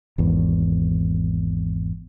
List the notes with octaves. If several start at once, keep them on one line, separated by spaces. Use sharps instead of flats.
G#1 E2